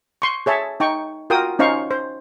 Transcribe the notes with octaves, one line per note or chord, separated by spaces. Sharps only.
C6 C#6
G#4 C#5 E5 A5
D#4 G5 C#6
F4 F#4 A#4 G5 D#6
C#4 D#4 C5 F5 C#6
C5